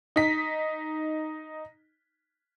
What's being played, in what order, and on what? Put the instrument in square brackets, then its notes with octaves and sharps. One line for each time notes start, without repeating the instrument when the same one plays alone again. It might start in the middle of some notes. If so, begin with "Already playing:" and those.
[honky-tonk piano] D#4 B6